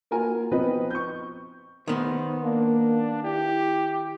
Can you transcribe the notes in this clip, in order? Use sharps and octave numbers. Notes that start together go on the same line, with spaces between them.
A#3 F4 F#4 A#4 G#5
F3 B3 C4 B4 D#5
C#6 G6
D#3 B3 C5
A#3 D4
E4 G4